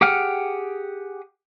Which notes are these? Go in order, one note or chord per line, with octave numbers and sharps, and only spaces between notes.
G4 G#4 F#5 G5 F6